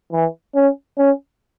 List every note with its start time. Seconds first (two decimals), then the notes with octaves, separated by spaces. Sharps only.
0.12 E3
0.55 C#4
0.98 C#4